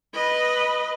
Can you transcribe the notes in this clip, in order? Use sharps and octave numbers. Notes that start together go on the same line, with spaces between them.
B4 D#5